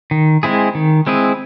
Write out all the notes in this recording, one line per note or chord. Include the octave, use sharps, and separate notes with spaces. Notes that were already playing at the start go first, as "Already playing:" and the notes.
D#3
G#3 C4 E4 G#4
D#3
G#3 C4 E4 G#4